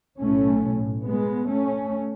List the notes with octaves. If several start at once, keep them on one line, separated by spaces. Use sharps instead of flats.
B1 A2 A3 C#4
G#3 B3
A3 C#4